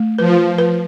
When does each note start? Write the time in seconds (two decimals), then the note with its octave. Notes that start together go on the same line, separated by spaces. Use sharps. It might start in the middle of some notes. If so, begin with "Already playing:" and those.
Already playing: A3
0.19 F3 B4
0.58 B4